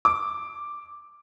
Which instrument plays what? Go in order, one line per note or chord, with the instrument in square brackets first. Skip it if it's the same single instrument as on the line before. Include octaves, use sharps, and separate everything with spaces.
[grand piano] D6